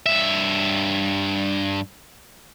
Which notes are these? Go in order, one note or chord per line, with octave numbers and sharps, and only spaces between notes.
G2 E5